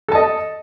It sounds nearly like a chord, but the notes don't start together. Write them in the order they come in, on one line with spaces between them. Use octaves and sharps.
A4 A5 D#5